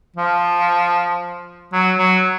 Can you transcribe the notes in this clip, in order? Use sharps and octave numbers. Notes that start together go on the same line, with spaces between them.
F3
F#3
F#3